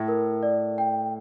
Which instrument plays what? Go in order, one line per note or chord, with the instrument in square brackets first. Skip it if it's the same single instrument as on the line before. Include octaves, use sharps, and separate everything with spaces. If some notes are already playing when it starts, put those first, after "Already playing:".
Already playing: [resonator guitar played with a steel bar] A2
[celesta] A#4
D5
G5